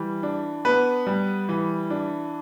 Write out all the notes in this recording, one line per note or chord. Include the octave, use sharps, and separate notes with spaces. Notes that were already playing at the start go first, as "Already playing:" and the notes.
Already playing: E3 G3
D4
B3 B4
G3
E3
D4